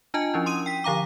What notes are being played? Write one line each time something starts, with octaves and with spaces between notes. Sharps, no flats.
D4 F4 D#5 G#5 A5
F3 C#4 E4
C6 D#6 D#7
G5 B6
D3 F3 F5 A#5 D6